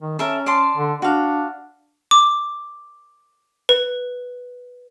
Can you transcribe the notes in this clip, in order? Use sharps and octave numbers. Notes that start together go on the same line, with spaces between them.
D#3
C#4 A4 A#4 E5
D5 A5 C6
D3
D4 F#4 F5
D6
B4